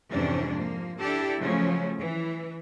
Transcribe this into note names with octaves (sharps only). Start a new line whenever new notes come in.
F2 G#2 C3 E3 C#4 D4
F3 A#3
D4 E4 G4 A4
C#3 F3 F#3 A3 C#4
E3